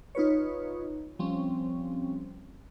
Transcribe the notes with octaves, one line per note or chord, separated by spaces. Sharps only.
D#4 F4 B4 C#5
F3 G3 C4 C#4